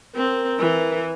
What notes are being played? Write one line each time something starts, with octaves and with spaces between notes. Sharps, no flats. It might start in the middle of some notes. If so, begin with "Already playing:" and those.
C4 A#4
E3 E4